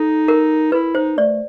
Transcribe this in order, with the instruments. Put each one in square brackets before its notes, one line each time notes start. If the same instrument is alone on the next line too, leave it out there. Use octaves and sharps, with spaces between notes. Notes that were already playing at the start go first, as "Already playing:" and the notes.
Already playing: [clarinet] D#4 [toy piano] A4
[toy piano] A#4
[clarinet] E4 [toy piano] B4
[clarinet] D#4 [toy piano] C5
[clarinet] A3 [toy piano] D5